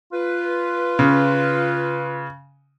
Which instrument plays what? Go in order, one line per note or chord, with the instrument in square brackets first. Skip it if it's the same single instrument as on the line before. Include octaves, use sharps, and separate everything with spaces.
[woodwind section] F4 B4
[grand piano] C#3